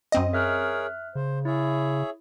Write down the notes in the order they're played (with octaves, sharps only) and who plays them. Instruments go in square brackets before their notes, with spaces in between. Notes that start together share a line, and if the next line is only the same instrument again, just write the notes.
[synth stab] F#2 C4 D#5
[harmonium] G#4 A#4 C#5 [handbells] E5 F6 F#6
[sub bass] C#3 [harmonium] C5
[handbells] E4 [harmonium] G#4 C#5 E5